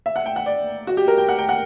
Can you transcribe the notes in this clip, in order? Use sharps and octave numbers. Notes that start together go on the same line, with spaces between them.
E5
F#5
G5
F#5
D5
F#4
G4
A#4
G5
F#5
G5
F#5